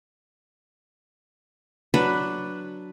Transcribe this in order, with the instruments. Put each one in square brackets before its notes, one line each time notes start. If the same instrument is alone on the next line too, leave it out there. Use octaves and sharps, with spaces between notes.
[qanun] F#3 D4 B4